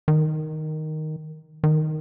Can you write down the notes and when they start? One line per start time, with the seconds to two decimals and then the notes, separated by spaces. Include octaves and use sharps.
0.08 D#3
1.64 D#3